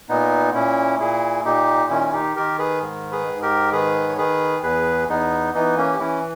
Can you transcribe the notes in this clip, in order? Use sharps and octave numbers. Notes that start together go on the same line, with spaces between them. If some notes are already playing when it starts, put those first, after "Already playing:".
A#2 B3 D#4
A#2 C#4 E4
A#2 E4 G#4
A#2 D#4 G4
D#3 C#4 E4
E4
D#4 G4
D#3 G4 A#4
G#4 B4
G#2
G#4 B4
G#2
G4 A#4
D#3 G#4 B4
C#5
D#3 G#4 B4
E2 G#4 B4
E2 B3 D#4
E3 B3 D#4
A#3 C#4
G4
E3 C#4 E4